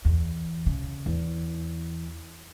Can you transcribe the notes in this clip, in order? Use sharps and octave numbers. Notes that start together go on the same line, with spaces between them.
E2
C#3
E2